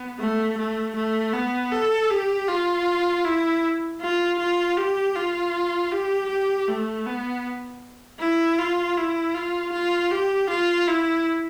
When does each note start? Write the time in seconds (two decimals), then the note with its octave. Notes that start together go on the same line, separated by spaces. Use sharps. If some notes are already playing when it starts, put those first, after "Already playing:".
Already playing: B3
0.19 A3
0.57 A3
0.95 A3
1.34 B3
1.71 A4
2.10 G4
2.48 F4
3.24 E4
4.01 F4
4.39 F4
4.77 G4
5.15 F4
5.92 G4
6.29 G4
6.67 A3
7.06 B3
8.20 E4
8.58 F4
8.97 E4
9.35 F4
9.72 F4
10.11 G4
10.49 F4
10.87 E4